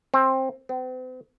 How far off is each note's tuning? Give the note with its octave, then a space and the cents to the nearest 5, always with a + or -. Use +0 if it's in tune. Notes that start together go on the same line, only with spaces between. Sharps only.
C4 +15
C4 -45